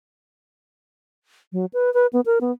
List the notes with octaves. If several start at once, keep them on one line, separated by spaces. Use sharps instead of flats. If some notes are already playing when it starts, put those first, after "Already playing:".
F#3
B4
B4
B3
A#4
B3